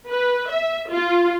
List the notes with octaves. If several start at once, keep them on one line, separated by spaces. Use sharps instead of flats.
B4
E5
F4